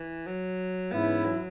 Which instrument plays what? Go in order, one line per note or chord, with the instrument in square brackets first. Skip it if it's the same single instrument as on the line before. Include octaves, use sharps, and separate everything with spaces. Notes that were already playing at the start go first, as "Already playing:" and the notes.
Already playing: [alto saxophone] E3
F#3
[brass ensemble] G#2 E3 C#4 E4 [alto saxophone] B3
[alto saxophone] F#3